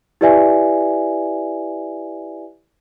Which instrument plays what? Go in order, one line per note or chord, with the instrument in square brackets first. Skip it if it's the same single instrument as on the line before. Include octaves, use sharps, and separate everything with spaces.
[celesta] E4 G4 B4 D5 E5 G#5